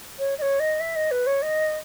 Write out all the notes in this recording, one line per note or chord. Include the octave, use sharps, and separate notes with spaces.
C#5
D#5
C#5
D#5
E5
D#5
B4
C#5
D#5